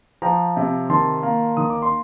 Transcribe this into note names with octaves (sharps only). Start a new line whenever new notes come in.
F3 G5 A#5
C3
D#3 A5 C6
A#3
D#3 D#6
D6
C6